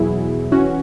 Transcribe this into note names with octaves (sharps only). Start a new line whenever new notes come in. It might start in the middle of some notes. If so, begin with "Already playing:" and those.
Already playing: E2 B2 F#3 E4 G#4
E3 C#4 F#4